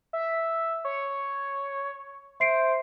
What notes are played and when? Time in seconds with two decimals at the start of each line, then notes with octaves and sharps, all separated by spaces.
0.13 E5
0.85 C#5
2.40 C5 E5 C7 D7